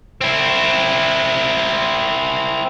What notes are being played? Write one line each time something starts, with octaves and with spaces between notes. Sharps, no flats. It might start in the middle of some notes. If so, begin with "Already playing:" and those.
C4 E4